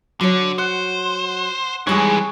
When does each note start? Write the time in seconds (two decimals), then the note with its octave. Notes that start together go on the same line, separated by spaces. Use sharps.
0.21 D3 F#3 C#5
0.58 C5 F#5
1.87 F2 E3 G3 G#3 D#4 G#4 C#5